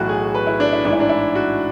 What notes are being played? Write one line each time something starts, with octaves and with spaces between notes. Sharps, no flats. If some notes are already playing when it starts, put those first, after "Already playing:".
Already playing: B1 A2 E3 F#4
G#4
B4
E4
D4
E4
A1 G#2 E3 D4
E4
D4
E4
F#4